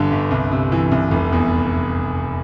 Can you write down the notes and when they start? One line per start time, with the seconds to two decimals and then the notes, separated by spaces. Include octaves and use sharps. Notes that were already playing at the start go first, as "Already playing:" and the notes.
Already playing: G1 G2 D3
0.11 G1
0.31 C2
0.52 C3
0.72 E3
0.91 C2
1.11 F1
1.32 E2